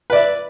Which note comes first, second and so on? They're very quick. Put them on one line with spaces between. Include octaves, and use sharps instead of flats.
B4 D5 E5